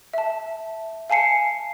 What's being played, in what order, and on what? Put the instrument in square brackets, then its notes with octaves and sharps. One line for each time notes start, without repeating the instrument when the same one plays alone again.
[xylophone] E5 A5
F5 G#5 A5 C7 C#7